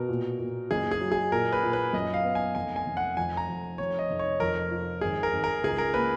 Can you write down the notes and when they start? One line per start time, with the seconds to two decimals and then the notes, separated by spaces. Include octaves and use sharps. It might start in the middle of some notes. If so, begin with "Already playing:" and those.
Already playing: B2 A#4
0.09 A#2
0.39 A#2
0.71 F#1 G#4
0.91 G#4
1.01 F#3
1.12 G#4
1.32 A#2 A#4
1.53 B4
1.63 A#2
1.73 B4
1.93 F#2 D#5
2.14 F5
2.25 B3
2.35 G#5
2.55 F1 G#5
2.76 G#5
2.86 F1
2.97 F#5
3.17 F2 G#5
3.37 A#5
3.48 F2
3.78 F1 C#5
3.99 D#5
4.10 F1
4.19 C#5
4.40 F2 A#4
4.71 F4
5.01 G#1 G#4
5.23 A#4
5.33 G#1
5.44 A#4
5.64 C#2 G#4
5.78 A#4
5.94 A#3 B4